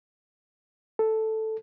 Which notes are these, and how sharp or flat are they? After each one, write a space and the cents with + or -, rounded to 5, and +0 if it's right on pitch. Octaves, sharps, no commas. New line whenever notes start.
A4 +0